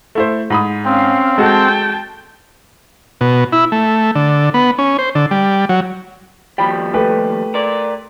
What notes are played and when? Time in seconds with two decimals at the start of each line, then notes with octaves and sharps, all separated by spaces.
0.15 A3 E4 C5
0.50 G#2 B5 D#6
0.85 C4 C#4 F5
1.38 G#3 F#4 A4 G5 A5
3.21 B2
3.53 E4
3.72 A3
4.15 D3
4.54 B3
4.79 C#4
4.99 C5
5.15 D3
5.31 G3
5.69 F#3
6.58 D#2 F3 G3 G5 B5
6.94 A3 G4 B4
7.54 A#4 D5